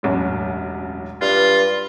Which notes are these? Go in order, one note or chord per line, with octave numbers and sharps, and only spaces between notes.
E1 A1 F#2
G2 F4 B4